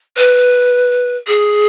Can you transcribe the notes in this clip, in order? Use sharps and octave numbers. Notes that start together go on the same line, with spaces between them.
B4
G#4